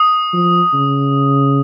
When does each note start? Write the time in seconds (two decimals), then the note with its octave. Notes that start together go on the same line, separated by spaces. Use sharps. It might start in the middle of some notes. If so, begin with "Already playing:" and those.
Already playing: D#6
0.33 F3
0.74 C#3